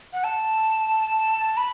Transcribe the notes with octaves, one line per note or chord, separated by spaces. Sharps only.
F#5
A5
B5